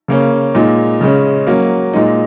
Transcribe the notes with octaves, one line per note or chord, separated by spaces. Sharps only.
C#3 A#3 C#4
A#2 G#3 D#4
C#3 G#3 C#4
F#3 A#3 C#4
A#2 G#3 D#4